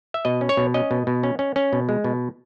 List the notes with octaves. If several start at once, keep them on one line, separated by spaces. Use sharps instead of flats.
E5
B2 D#5
C#4
C#5
B2
C#4 D#5
B2
B2
C#4
C#4
C#4
B2
G#3
B2